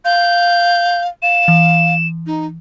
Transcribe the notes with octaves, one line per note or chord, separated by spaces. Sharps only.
F5 G6
F5 E7
E3
D#4